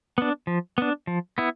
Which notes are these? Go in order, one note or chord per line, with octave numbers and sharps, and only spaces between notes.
B3 D4
F3
B3 D4
F3
B3 E4